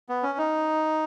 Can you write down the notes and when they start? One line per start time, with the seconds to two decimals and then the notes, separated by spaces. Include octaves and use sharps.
0.09 B3
0.23 C#4
0.38 D#4